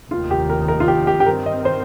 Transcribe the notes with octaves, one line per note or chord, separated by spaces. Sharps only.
F1 D#2 D#3 F4
G4
A#4
A#4
F4
G4
G4
G4
G2 D#3 C4 A#4
D#5
C5